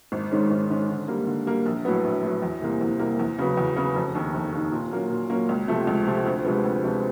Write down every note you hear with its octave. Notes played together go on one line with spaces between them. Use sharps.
G#1
G#2 D#3 G#3 C#4
G#1
G#2 D#3 G#3 C#4
D3
G3 A#3
D3
G3 A#3
A#1
A2 F#3 B3
A#1
A2 F#3 B3
E2
C3 E3 G3 A#3
E2
C3 E3 G3 A#3
E2
C#3 F#3 B3
E2
C#3 F#3 B3
F1
D#2 D#3
F1
D#2 D#3
A#2
F#3 A#3 C#4
A#2
F#3 A#3 C#4
C#2
C3 F3 A3
C#2
C3 F3 A3
D2
C3 F3 G#3 B3
D2
C3 F3 G#3 B3